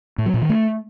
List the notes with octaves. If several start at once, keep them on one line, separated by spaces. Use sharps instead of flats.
A2
F#3
A#2
D#3
A3